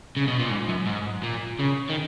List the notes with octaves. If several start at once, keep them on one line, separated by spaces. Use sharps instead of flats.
C#3
B2
A#2
G#2
F#2
G#2
A#2
C#3
D#3